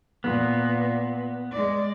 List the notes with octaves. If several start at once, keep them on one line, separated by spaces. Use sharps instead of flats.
A#2 B3
G#3 D5